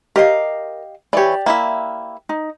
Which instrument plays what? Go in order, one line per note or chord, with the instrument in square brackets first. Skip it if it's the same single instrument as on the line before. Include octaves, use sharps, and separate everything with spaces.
[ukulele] G4 D#5 F5 [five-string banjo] A#4
[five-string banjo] E3 C#5 [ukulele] G4 D5
[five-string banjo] A#3 E4 E5
[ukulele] D#4